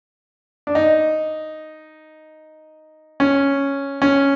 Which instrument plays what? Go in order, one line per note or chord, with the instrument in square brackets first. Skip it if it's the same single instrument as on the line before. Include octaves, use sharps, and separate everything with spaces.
[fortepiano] D4
D#4
C#4
C#4